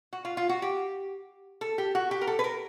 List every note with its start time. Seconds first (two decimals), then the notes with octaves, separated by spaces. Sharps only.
0.13 F#4
0.25 F4
0.37 F4
0.49 F#4
0.62 G4
1.61 A4
1.78 G4
1.95 F#4
2.11 G4
2.21 A#4
2.27 A4
2.39 B4
2.44 A#4